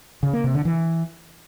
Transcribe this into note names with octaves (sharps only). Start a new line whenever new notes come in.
C#3
A#3
C3
D3
E3